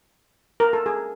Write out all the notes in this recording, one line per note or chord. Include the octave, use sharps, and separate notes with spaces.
A#4
A4
G#4